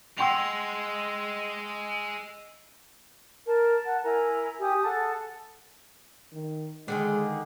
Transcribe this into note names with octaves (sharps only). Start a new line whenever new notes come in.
G#3 F#5 G5 C6 E6 F7
A#4 A5
F#5
E4 A#4 G#5 A#5
G4 G#5 D#6
G#4 A4 F#5 A5
D#3
D3 D#3 G#3 G#4